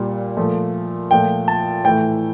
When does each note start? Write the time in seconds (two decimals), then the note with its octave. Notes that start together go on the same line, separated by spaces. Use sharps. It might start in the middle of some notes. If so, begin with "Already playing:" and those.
Already playing: A#2 G3
0.37 A#2 F3 A3
1.11 A#2 F3 A3 G5
1.48 A5
1.84 A2 E3 A3 G5